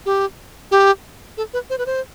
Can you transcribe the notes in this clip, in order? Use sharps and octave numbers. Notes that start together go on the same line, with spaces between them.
G4
G4
A4
B4
C5
B4
C5